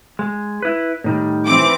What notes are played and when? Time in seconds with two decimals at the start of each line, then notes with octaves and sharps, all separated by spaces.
0.19 G#3
0.62 E4 B4
1.04 A2 D#3 G3
1.46 E3 C4 D6